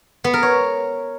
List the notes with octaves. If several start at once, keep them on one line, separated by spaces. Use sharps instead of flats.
B3
A#4
C#5